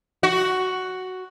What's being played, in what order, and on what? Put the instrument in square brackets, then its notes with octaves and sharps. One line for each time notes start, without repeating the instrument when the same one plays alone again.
[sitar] F#4